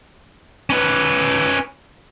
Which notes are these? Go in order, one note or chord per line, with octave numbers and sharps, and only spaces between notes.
C#4 B4